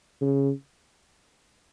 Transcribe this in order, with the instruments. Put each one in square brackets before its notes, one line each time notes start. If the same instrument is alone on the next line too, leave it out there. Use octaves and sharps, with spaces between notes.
[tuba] C#3